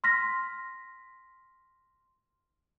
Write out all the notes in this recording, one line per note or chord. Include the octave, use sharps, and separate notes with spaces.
C6 F6 A#6 B6